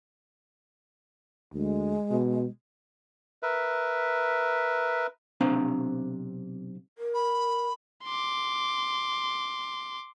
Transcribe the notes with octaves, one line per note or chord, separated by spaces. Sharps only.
D2 G#3
B2
A#4 B4 E5
B1 C3 C4 D4 F5 A#5
A#4
B5
C6 D6